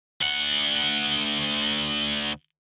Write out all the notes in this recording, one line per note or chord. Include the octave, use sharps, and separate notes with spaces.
D2 F#5